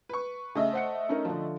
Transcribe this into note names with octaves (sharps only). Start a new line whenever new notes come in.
B4 C#6
C#3 A3 D#5 E5
C5 F#5 C#7
C#4 D#4 A#4
D3 F3